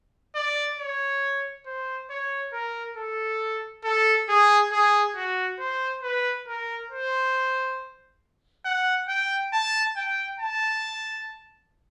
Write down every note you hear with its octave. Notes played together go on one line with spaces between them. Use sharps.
D5
C#5
C5
C#5
A#4
A4
A4
G#4
G#4
F#4
C5
B4
A#4
C5
F#5
G5
A5
G5
A5